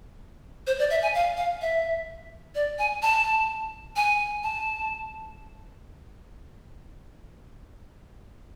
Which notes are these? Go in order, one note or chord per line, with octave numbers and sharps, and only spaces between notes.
C5
D5
E5
G#5
F5
F5
E5
D5
G#5
A5
G#5
A5